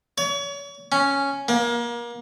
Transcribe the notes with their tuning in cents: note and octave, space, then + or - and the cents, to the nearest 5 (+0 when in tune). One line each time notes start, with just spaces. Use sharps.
C#5 +35
C#4 +0
A#3 +30